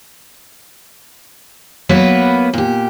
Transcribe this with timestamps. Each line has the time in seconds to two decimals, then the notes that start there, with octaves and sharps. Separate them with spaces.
1.89 F#3 A#3 B3 B4
2.53 A#2 G4